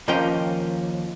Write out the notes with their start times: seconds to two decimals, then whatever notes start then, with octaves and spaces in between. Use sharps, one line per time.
0.08 D#2 F3 A#3 C#4 G5